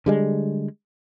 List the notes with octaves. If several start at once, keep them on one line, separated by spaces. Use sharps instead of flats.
D3 G3 G#3